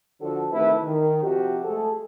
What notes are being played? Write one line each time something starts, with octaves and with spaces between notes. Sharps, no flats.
D3 F3 F#4 A4
C3 D#3 A3 E4 B4
D#3
C3 F3 F#4 G4
G#3 A3 G#4 A4